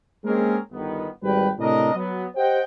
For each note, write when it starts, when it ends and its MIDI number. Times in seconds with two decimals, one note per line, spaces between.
0.24 0.58 56
0.24 0.58 58
0.24 0.58 60
0.24 0.58 61
0.24 0.58 68
0.24 0.58 70
0.72 1.09 31
0.72 1.09 51
0.72 1.09 59
1.23 1.50 32
1.23 1.50 55
1.23 1.50 71
1.23 1.50 79
1.59 1.91 45
1.59 1.91 48
1.59 1.91 62
1.59 1.91 70
1.59 1.91 75
1.94 2.25 54
1.94 2.25 59
2.36 2.62 67
2.36 2.62 72
2.36 2.62 75
2.36 2.62 78
2.36 2.62 79